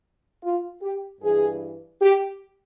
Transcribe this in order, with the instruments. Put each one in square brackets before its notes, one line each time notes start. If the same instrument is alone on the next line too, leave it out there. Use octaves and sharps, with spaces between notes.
[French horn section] F4
G4
G2 E3 G#4
G4